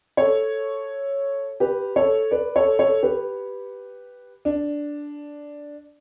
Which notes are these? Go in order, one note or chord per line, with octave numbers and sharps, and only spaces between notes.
A4 C#5
G4 B4
A4 C#5
B4 D5
A4 C#5
A4 C#5
G4 B4
D4